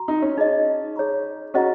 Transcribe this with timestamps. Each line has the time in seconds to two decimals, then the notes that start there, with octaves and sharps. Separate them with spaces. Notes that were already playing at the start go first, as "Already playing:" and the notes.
Already playing: F#4 A#5
0.08 D#4
0.22 C#4
0.38 D#4 G#4 D#5
0.96 G#4 C#5 A#5 C#6
1.54 C#4 F#4 G#4 D#5 A#5 C#6